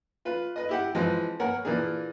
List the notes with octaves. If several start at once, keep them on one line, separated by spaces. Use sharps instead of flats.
F4 B4
B4 D#5
E4 G4 F#5
E3 F3 G#3 C4
A#3 B3 A#4 C#5 F#5 G#5
A#2 E3 A#3 D4 G#4